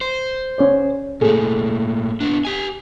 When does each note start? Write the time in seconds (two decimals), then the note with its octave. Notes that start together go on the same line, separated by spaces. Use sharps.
0.01 C5
0.58 C#4 C#5 D5
1.21 A#2 A3 G#4 A4
2.20 B3 D4
2.45 G4 G#5